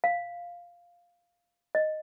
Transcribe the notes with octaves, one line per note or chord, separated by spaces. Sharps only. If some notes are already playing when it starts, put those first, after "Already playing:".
F5
D#5